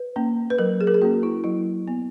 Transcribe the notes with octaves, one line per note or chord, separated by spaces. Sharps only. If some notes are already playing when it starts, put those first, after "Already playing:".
Already playing: B4
A#3 C#4
B4
F#3 A#4
G#4
A#4
G#4
A#3 C#4 F#4
E4
F#3 E4
B3